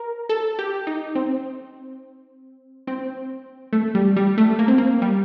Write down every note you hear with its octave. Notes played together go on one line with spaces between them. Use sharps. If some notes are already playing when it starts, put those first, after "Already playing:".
Already playing: A#4
A4
G4
D#4
C4
C4
A3
G3
G3
A3
A#3
C4
A#3
G3